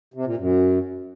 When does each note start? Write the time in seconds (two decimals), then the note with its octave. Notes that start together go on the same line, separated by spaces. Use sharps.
0.14 C3
0.26 A#2
0.37 F#2